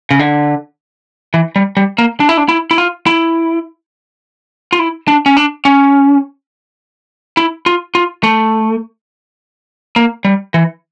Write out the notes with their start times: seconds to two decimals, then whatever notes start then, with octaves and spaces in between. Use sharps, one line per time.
0.11 C#3
0.19 D3
1.34 E3
1.56 G3
1.77 G3
1.98 A#3
2.20 D4
2.29 E4
2.37 D4
2.49 E4
2.71 E4
2.78 F4
3.06 E4
4.73 F4
4.79 E4
5.08 D4
5.26 C#4
5.37 D4
5.65 C#4
7.37 E4
7.66 F4
7.95 F4
8.23 A3
9.96 A#3
10.25 G3
10.54 E3